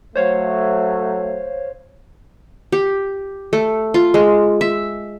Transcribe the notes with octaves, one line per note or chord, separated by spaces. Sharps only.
F#3 A3 C5 C#5 F5
G4
A3
F4
G#3
E5